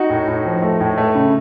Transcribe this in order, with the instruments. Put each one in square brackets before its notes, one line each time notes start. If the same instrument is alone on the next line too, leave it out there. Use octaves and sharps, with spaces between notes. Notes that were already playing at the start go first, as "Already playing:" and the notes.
Already playing: [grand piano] D#4 F#4
A2
A2
F3
A3
A2
A3
C#3